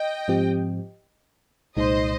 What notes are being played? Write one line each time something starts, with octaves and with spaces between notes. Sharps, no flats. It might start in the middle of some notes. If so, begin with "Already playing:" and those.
Already playing: D#5 G5
G#2 F3 C4 G4
C2 A#2 G#3 D#4 C5 D#5